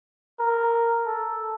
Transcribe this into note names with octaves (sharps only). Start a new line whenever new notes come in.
A#4
A4